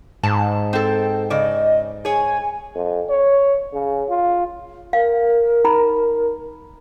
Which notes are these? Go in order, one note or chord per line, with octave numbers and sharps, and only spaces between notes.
G#2 A5
C4 A4 G5
C#3 D5 D#5
G#4 C#5 G#5
F2
C#5
C#3
F4
A#4 F5
D#4 A#5 B5